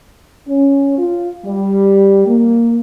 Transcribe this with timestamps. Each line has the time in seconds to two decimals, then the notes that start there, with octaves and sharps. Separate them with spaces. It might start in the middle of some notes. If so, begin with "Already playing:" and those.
0.48 C#4
0.98 F4
1.45 G3
2.27 A#3